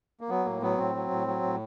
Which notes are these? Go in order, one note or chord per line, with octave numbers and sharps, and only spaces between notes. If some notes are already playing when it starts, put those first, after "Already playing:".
A#3
F#3 B3
A2 A#3
F#3 B3
A2 C4
F#3
A2
F#3
A2